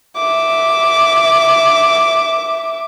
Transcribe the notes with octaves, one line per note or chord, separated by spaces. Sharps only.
E5 D6